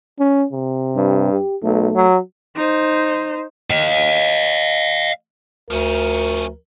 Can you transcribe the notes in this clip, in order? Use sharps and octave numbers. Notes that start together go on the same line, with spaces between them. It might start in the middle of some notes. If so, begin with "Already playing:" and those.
C#4
C3
G2
G4
B1 A3
F#3
D#4 C5
D#5 F5
D2 F3 C#4 A#4